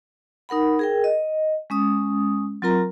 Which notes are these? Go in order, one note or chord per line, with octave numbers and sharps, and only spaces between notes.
D#4 A#4 F#5 B5
G#4 A#4 G5
D#5
G#3 C#4 D#6
F#3 C4 F4 A#4 A#5